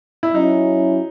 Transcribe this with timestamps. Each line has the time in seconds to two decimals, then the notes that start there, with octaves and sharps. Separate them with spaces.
0.23 E4
0.34 F#3 C#4 D#4 E4